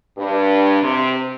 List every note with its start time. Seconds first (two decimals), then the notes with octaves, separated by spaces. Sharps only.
0.18 G2
0.82 C3